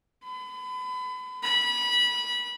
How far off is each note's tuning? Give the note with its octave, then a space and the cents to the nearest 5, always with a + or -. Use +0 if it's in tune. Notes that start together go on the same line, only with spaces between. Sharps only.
B5 +35
B5 -20